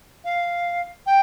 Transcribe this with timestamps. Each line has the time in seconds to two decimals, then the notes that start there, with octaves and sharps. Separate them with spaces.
0.25 F5
1.06 G5